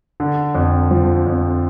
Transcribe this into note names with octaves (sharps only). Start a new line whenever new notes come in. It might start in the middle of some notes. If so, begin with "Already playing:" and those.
D3
F2
F3
F2